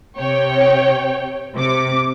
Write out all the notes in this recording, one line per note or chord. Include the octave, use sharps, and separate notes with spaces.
C3 C#5 G5
C3 D6